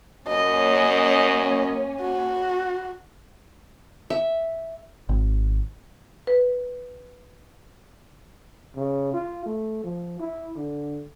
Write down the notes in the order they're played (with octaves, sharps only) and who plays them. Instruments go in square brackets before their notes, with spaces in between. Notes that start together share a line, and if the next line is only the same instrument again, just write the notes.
[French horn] F#2 [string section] A#3 C#4 [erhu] D#5
[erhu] F#4
[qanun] E5
[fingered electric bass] G#1
[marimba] B4
[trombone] C#3
F4
A3
F3
E4
D3